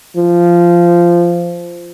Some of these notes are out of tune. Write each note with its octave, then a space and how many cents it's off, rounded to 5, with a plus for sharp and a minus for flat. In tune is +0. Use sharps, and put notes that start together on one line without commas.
F3 -15